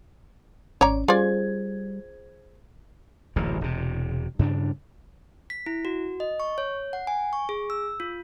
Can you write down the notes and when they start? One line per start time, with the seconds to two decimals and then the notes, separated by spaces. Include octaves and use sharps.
0.81 G#1 C#4 C#5 D5 A#5
1.08 G3 F4 G#4 C5 D5 G#6
3.36 D1 A1 F#2 A#2
3.61 E1 C3
4.39 G2 C#3 D4
5.50 B6
5.66 E4
5.85 F#4
6.20 D#5
6.40 C#6
6.58 C#5
6.93 F#5
7.07 G#5
7.33 C#6
7.49 G#4
7.70 E6
8.00 F4